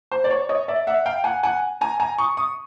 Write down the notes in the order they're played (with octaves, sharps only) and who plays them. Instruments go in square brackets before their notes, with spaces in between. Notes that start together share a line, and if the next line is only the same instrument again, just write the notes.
[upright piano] C5
D5
C#5
C#5 D#5
D5 E5
E5 F#5
F5 G5
F#5 G#5
F#5 G#5
G#5 A#5
G#5 A#5
C#6 D#6
C#6 D#6